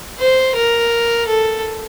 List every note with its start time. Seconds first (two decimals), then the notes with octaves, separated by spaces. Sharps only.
0.19 C5
0.56 A#4
1.27 A4